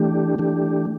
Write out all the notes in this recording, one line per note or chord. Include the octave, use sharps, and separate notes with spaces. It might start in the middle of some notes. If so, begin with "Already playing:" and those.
Already playing: E3 A3 D4 G4
E3 A3 D4 G4